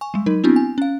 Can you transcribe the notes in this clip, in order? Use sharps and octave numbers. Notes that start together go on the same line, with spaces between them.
G#5 C#6
G3 G#3
F#3 D#4 A#4
B3 C4 D4 E4 F#4
G#5
C#4 F5